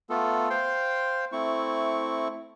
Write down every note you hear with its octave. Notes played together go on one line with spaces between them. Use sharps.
A3 B3 F4 A4
C5 F5 G5 C6
A3 C4 E4 C#6